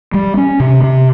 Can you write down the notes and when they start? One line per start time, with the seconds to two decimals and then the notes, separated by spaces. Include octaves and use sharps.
0.14 G3
0.37 C#4
0.60 C3
0.83 C3